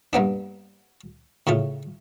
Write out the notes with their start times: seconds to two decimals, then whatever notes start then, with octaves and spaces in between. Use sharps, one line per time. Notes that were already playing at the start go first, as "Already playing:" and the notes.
0.13 G2 A#3 B3 D4
1.47 A2 C#3 A3 F4